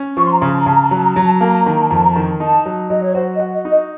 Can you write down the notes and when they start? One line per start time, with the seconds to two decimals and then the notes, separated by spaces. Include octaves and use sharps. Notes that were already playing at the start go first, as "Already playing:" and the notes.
Already playing: C#4
0.17 F3 C#6
0.24 C6
0.32 A#5
0.40 C#3 C6
0.54 A5
0.60 A#5
0.66 C#3 A5
0.75 A#5
0.82 A5
0.89 F#3 A#5
0.97 A5
1.04 A#5
1.10 A5
1.16 F#3 A#5
1.25 A5
1.32 A#5
1.39 A#3 A5
1.46 A#5
1.54 A5
1.60 A#5
1.66 D#3 A5
1.75 A#5
1.81 A5
1.89 F2 A#5
1.96 A5
2.03 A#5
2.10 A5
2.16 D#3
2.40 D#4 A5
2.66 F#3
2.89 F#3 D#5
3.03 C#5
3.15 F#4 C5
3.34 D#5
3.40 F#4
3.52 D#5
3.65 D#4
3.71 D#5